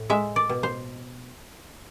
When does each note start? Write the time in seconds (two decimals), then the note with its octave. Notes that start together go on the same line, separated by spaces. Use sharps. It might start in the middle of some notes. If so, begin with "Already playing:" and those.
Already playing: A2
0.10 G#3 E5
0.36 D5
0.49 B2
0.63 C5